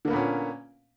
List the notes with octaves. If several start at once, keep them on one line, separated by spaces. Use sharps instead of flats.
A#2 D3 A#3 B3 C#4